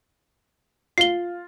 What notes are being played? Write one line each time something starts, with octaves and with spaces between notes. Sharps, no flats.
F4 C7 G7